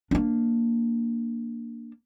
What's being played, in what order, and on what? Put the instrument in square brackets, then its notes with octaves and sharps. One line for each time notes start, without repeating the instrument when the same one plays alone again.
[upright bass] A#3 D4